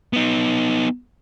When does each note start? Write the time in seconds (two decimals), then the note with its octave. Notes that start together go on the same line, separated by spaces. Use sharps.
0.13 B3 D#4